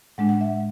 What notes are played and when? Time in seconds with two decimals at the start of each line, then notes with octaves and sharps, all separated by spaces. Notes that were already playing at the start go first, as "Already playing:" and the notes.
0.18 A2 G#3 D4 F#5
0.29 F#5
0.41 E5